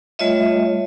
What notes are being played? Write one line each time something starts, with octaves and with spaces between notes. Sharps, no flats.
G3 A3 F4 C#5 D#5 E5